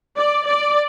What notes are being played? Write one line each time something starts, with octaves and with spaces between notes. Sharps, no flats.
D5
D5